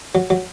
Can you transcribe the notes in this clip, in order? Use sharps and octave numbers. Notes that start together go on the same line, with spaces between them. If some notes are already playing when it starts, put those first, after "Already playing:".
F#3
F#3